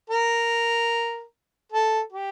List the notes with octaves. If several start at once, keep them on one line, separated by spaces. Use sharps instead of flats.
A#4
A4
G4